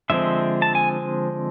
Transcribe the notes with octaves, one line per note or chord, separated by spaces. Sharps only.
D3 F3 G#3 C4 E5
A5
G#5